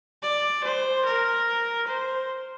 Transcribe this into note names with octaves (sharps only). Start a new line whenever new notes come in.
D5
C5
A#4
C5